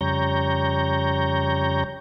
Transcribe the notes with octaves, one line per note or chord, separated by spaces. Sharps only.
F2 C#3 G3 C#5 A#5 G6